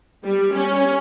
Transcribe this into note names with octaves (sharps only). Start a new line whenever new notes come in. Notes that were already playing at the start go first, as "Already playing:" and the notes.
G3
C#4